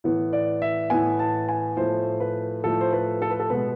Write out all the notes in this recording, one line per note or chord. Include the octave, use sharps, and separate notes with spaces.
A2 E3 B3
D5
E5
A2 E3 B3 G#5
A5
G#5
A2 F3 A3 C5
B4
A2 F3 A3 A4
C5
B4
A4
B4
A4
B2 G#3 B3 B4